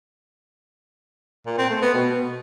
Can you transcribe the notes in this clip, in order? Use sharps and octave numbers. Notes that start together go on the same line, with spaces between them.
A#2
C4
A3
B3
B2